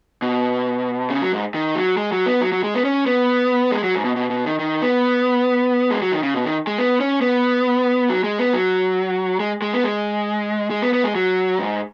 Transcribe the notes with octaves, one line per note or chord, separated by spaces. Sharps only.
B2
C#3
F#3
G#2
D#3
F#3
G#3
F#3
B3
F#3
F#3
G#3
B3
C#4
B3
G#3
F#3
G#2
B2
B2
B2
D#3
D#3
B3
G#3
F#3
D#3
C#3
B2
D#3
G#3
B3
C#4
B3
F#3
G#3
B3
F#3
G#3
G#3
B3
G#3
G#3
B3
B3
G#3
F#3
G#2